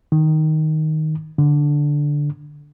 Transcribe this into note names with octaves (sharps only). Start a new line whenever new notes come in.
D#3
D3